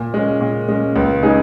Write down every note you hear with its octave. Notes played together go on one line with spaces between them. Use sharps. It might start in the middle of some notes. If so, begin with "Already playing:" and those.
Already playing: A#2
G#3 C#4
A#2
G#3 C#4
C#2
C#3 G#3 D#4 G#4